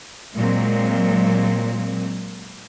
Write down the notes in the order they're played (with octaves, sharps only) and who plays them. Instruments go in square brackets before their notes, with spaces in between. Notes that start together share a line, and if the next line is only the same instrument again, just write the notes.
[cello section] A#2 F#3 G#3 C4